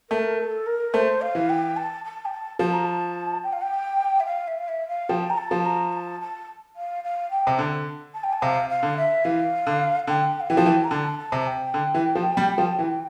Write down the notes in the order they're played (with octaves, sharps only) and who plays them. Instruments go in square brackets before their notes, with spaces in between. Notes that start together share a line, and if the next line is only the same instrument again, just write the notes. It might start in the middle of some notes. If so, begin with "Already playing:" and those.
[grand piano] A3 [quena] A#4
[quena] A4
A#4
[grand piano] A3 [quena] C5
[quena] F5
[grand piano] E3
[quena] G5
A5
A5
G5
A5
[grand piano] F3 [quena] A5
[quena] A#5
A5
G5
F5
G5
E5
F5
E5
F5
E5
F5
[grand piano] F3 [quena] G5
[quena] A#5
A5
[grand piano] F3
[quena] A#5
A5
A5
F5
F5
G5
[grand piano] C3
D3
[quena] A5
G5
A5
[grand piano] C3 [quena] F5
[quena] F5
[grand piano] D3
[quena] E5
[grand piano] E3 [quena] F5
[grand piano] D3
[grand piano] D3 [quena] G5
[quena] F5
[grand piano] E3 [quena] G5
[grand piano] F3
E3
[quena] A#5
[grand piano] D3 [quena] A5
[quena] A5
[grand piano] C3
[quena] G5
[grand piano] D3
E3
F3
G3
F3
E3